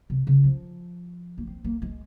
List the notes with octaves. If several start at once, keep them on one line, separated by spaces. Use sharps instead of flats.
C3
C#3
F3
A#3
C4
A#3
G#3